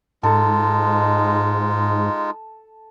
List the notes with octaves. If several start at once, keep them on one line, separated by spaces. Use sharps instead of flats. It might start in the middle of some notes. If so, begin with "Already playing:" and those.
G#2 G#3 D#4 F4 A4